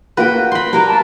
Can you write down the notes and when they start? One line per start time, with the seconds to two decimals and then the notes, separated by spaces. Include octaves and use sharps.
0.17 A#3 F4 F#4 B4 G5
0.52 B5 C6
0.73 G3 A#3 A#4 B4 A#5
0.86 A5 A#5